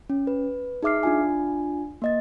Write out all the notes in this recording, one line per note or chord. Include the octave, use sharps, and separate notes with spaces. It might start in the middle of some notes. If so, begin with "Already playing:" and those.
C#4
B4
D#4 G#4 E5 D6 F6 C7
D4 F4 G#5
A#3 D#5 A6